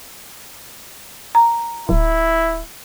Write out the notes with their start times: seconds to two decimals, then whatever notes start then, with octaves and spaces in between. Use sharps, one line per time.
1.35 A#5
1.89 D1 E4